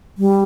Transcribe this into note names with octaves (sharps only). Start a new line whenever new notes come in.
G3